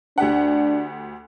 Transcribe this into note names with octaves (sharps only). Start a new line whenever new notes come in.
D2 D4 G4 F#5